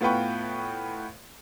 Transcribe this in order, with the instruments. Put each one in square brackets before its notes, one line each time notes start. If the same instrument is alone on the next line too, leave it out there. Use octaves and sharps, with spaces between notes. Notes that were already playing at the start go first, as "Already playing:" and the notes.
[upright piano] A2 B3 F4 B4 G5 C#6